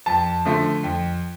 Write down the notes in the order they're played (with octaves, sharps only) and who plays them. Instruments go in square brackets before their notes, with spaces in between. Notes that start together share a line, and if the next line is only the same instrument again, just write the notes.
[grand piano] F2 A5
D3 F3 A3
F2